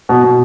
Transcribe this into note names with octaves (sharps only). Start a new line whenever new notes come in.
B2
B2